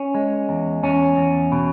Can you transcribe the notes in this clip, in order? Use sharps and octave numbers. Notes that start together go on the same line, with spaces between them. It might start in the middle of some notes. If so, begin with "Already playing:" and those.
Already playing: C#4
G#3
E2
E2 C#4
E2
B2